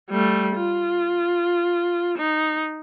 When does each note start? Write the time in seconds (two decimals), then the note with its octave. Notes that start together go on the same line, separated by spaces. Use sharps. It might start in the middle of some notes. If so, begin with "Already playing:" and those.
0.10 G3 A3
0.56 F4
2.18 D#4